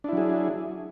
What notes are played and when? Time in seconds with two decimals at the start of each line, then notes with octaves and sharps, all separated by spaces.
0.04 D4
0.09 E4
0.13 F#3
0.17 G#4